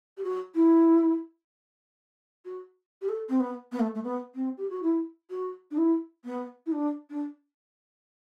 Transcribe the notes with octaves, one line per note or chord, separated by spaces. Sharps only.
G4
F#4
E4
F#4
G4
A4
C4
B3
B3
A3
A3
B3
C4
G4
F#4
E4
F#4
D4
E4
B3
E4
D4
D4